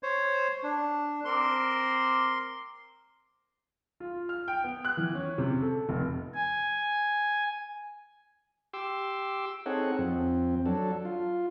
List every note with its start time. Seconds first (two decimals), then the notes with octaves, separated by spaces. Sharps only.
0.03 C5 C#5
0.63 D4
1.25 C4 A#4 C6 D6
4.00 F4
4.29 F6
4.48 G5
4.64 B3
4.85 F#6
4.97 E3
5.15 C#4
5.38 C3
5.62 A4
5.89 F1
6.34 G#5
8.74 G4 C6 D6 E6
9.66 C4 D#4 G#4 A4 C#5 F#5
9.99 F2 C4
10.66 F#3 D4 A4
11.05 F4